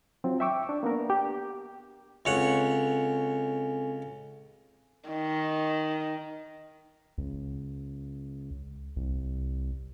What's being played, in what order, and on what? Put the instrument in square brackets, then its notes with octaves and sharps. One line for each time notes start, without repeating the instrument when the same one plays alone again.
[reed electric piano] F#3 C4 F4
E5 G5 C#6 D6 E6
D4
A#3 B3 D4 A#4
G4
[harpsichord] C#2 C#5 F#5 [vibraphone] C4 A4 G#5
[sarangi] D#3
[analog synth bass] C#2
C2